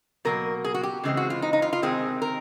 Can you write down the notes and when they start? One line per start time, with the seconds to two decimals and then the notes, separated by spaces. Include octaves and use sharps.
0.25 B2 F#3 A#3 A#4
0.64 G#4
0.74 F#4
0.83 G4
1.04 C#3 E3 G#3 C4
1.17 F#4
1.30 F4
1.42 D#4
1.53 D#4
1.62 F4
1.73 F4
1.82 C3 D#3 G#3 C4 G#4
2.22 A#4